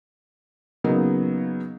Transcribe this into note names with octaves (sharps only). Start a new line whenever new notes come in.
C#3 F#3 A#3 B3 D#4